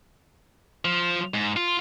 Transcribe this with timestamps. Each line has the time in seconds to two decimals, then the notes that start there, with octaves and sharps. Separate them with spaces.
0.85 F3
1.34 G#2
1.57 F4